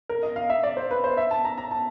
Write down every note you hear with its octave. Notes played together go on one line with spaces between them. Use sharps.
A#4
D#5
F5
E5
D5
C5
B4
C5
E5
A5
A#5
A#5
A5